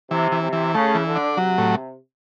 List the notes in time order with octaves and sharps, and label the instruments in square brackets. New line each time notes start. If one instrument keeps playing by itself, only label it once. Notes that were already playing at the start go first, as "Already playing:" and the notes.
[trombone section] C3 [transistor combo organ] E3
[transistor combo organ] E3
[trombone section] C3
[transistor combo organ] E3
[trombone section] C#3 [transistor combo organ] A3
[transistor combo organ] E3
[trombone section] D3
[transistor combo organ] D4
[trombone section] C3 [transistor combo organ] F#3
[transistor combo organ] A2